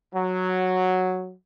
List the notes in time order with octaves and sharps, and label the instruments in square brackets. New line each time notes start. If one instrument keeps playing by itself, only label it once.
[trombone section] F#3